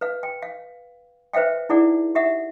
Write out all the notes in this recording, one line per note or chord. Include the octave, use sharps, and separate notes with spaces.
B4 F5
G5
F5
B4 C5 E5 F5 G5
D#4 E4 G#4 D5 F#5
G4 E5 F#5